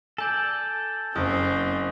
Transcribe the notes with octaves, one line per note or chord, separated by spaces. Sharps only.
A4 D5 G#5 G6 A6
F#1 C4 C#4 D#6